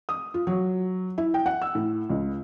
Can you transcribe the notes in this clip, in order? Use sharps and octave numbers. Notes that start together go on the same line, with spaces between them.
D#6
F4
F#3
E4
G5
F#5
E6
A2
C#2